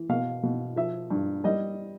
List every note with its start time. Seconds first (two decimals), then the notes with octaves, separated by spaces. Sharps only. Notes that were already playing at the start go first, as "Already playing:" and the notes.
Already playing: E3
0.09 B2 F5
0.43 B2
0.76 F3 E5
1.11 G2
1.44 G3 D#5